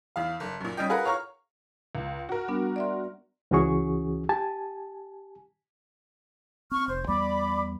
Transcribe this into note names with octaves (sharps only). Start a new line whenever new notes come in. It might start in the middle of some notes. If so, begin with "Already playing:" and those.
E2 F5
F#1
F#2 A#2
G3 C#4 D#5 G5
F4 G#4 A#4 B4 F#5
C#5 F5 A#5 C#6 F6
C#2
F#4 A#4
G3 B3 D4
D5 E5 C6
C#2 E3 C#4 F#4 G#4 C#6
G4 G#5 A5
C4 C#6 F6
F1 C5
E2 G3 B3 D5 B5 D6